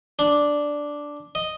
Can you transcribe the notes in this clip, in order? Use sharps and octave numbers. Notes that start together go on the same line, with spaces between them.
D4
D#5